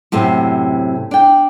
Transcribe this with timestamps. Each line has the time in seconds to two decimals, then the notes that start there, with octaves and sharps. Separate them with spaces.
0.12 F#2 A2 C3 C4
1.11 D4 G5